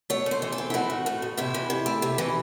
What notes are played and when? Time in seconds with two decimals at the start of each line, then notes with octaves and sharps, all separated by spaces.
0.10 A3 C#5
0.26 A3
0.31 C5
0.42 E3
0.52 A4
0.58 C4
0.70 E4
0.74 A3 F#4
0.90 A2
1.06 A3
1.22 A2
1.37 C3 E4
1.54 E3
1.70 C3
1.86 A3
2.02 C3
2.18 E3